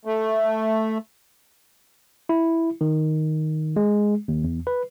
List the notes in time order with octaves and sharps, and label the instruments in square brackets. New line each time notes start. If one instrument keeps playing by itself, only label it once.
[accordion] A3
[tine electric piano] E4
D#3
G#3
D#2
E2
B4